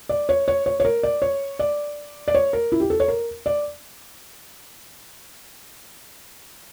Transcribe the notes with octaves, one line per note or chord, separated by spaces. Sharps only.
D5
C#5
C#5
C#5
C#5
A#4
D5
C#5
D5
D5
C#5
A#4
E4
G4
A4
C#5
A#4
D5